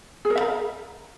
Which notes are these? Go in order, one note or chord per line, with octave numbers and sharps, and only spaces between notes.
G#4
A#4
E5
A#5